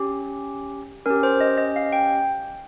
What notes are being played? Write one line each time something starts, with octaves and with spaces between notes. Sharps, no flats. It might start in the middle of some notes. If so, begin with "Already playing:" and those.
Already playing: C#4 G4
C#4 G4 A#4
C5
D#5
D#5
F5
G5